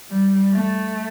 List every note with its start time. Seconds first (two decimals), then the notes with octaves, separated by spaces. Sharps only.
0.11 G3
0.53 A3